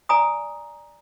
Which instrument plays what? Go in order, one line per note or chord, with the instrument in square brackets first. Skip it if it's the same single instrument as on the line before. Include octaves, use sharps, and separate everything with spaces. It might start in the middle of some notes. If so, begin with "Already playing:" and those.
[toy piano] D5 G#5 A#5 D#6